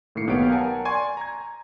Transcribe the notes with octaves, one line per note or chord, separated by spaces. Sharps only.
A2 D#3 A#3 C7 C#7
B1 B3 G4 C#5 F5 D7
A#4 F#5 G#5 A5
D5 G#5 C6 C#6 G#6
A#5 G#6